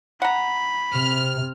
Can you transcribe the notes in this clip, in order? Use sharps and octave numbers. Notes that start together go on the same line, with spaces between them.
F#5 A#5 B5
C3 F6